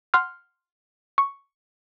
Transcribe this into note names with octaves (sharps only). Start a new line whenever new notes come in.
F#5 C6 F6
C#6